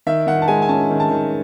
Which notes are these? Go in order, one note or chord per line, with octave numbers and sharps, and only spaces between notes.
D#3 E5
D#3 F#5
A5
G#3 G#5
G#5
C#4 A5
D#3
A5
D#3